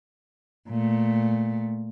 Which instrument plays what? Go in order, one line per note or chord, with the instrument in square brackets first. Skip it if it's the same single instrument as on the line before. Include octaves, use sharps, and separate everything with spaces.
[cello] A#2 A3